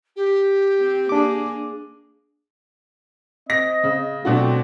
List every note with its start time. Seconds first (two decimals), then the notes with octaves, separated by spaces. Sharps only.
0.16 G4
0.80 C4
1.09 A#3 D4 G#4 D6
3.50 C4 D#5 A#6
3.84 C#3
4.25 B2 F#3 A3 C4 D4 F#4